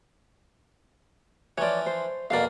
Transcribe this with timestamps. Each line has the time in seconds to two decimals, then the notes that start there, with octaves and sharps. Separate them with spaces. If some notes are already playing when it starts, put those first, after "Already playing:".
1.58 E3 F3 C#5 D5
1.86 C5
2.30 F2 B2 A#3 D5 F5